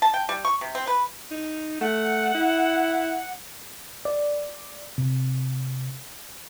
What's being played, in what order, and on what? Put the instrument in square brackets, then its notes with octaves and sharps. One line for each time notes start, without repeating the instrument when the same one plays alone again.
[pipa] A5
G5
G3
C#6
C3
C4
B4
[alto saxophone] D#4
[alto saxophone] A3 [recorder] F#5
[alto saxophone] E4
[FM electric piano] D5
C3